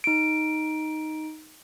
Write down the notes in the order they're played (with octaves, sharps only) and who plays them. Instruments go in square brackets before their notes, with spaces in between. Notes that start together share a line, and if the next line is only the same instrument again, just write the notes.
[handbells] D#4 D7